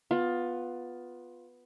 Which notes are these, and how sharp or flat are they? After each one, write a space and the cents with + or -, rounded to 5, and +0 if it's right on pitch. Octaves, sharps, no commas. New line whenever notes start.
B3 +0 F4 +15